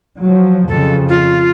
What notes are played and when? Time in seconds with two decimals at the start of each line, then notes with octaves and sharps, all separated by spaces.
0.22 F3 F#3
0.68 F2 C#3 A4
1.08 F4